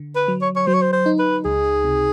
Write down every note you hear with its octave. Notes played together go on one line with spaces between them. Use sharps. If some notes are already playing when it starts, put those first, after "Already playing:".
Already playing: D3
B4
F#3
C#5
C#5
F#3 C5
C#5
C5
C5
D#4
B4
C#2 G#4
C3